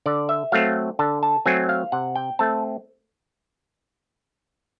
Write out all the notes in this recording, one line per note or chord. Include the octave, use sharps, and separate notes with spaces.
D3 D5
E5
F#3 A3 C4 F5
D3 A5
A5
F#3 A3 C4 G#5
F5
C3 F#5
G5
A3 C4 A5